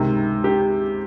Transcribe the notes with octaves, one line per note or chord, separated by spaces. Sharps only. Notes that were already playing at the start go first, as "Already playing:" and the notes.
Already playing: C#2 C3 D#3
G4